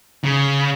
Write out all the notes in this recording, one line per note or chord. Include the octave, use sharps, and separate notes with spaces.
C#3